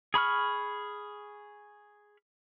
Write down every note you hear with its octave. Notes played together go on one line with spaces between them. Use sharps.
G#4 B5 C#6 F6